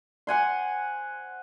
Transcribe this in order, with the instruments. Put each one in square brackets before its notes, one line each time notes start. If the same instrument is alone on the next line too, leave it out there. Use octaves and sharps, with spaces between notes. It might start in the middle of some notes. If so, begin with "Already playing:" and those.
[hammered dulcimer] C5 F#5 G#5 C6